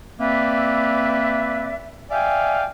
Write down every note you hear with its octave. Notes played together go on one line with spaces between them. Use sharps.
A#3 C4 B4 D5 E5
D5 E5 F5 G5 G#5